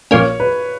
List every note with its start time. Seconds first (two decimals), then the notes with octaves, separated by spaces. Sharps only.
0.11 A#1 A#2 A#3 C#4 C#5
0.40 B4